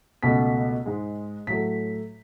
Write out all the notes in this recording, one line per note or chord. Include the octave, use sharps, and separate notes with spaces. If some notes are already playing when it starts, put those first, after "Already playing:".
C#2 B2 A3 B6
G#2 G#3
A2 F#3 A3 B6